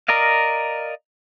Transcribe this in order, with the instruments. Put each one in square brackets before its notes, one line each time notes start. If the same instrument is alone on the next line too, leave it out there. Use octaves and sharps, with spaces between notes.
[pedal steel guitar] A#4 D5 D#5 F5